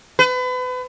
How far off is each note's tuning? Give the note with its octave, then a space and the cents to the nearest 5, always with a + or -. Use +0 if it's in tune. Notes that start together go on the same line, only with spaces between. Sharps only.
B4 +35